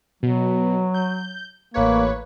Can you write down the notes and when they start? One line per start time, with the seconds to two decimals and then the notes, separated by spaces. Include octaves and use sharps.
0.23 B2 F#3
0.94 G6
1.74 A1 A#3 B4 C#5